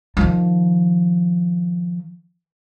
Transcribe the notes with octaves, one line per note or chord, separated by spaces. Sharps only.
D#3 F3